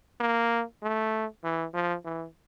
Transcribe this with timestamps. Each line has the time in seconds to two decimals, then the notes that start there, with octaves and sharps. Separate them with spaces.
0.20 A#3
0.83 A3
1.44 E3
1.74 F3
2.05 E3